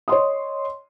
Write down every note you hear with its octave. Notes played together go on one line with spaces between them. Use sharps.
C#5 D#5 C6 D#6